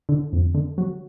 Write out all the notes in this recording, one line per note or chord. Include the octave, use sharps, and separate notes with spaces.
D3
F2
D3
F#3